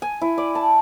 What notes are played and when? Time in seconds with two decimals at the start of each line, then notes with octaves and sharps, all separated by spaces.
0.02 G#5
0.21 E4
0.38 D5
0.55 A5